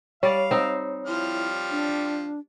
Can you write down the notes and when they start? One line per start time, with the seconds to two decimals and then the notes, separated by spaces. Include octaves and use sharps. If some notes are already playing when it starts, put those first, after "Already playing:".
0.23 G3 C#5 D5 F5
0.51 C4 D#4
1.06 F3 G3 E4 F6
1.71 D4